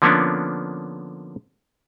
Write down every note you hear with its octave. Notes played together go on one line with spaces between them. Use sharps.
D3 F3 A#3 B3 C#4 D4